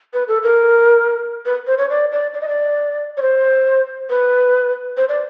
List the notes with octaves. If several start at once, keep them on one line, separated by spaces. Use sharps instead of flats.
B4
A4
A#4
B4
C5
C#5
D5
D5
D5
D#5
D5
C#5
C5
B4
C5
D5